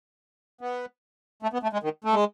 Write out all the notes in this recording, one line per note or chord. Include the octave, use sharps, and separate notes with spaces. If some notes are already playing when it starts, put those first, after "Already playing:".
B3
A3
B3
A3
G#3
D#3
A3
G#3